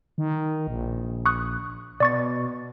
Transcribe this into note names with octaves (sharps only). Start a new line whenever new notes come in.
D#3
A#1
C#6 D#6 F#6
B2 D5 C#6 A6